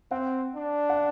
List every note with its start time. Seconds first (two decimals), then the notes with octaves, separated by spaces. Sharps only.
0.11 C4 F#5
0.56 D4
0.90 F#5